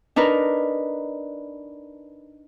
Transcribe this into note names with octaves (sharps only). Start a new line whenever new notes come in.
D4 D#4 A#4 B4